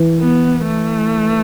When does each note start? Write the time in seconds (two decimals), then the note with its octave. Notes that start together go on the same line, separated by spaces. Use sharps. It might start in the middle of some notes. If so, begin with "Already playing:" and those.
Already playing: E3
0.20 B3
0.66 A3